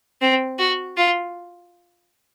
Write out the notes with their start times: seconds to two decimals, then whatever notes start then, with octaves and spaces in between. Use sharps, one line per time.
0.22 C4
0.59 F#4
0.97 F4